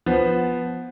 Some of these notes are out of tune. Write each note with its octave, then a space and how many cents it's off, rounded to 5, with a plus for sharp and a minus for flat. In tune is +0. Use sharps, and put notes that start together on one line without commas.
F3 +0 B3 +0